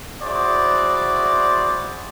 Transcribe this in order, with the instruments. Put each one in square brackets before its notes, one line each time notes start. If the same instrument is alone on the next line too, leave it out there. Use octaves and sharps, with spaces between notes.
[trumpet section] E4 F#4 G#4 C5 D5